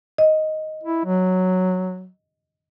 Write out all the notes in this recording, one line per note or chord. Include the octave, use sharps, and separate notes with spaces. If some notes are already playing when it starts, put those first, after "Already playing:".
D#5
E4
F#3